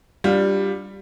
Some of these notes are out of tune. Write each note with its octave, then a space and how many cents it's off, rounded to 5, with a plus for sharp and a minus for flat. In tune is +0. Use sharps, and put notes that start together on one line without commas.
G3 +0 D4 +0 F4 +30